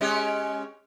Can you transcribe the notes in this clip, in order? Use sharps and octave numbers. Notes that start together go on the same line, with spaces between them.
G#3 C#4 G4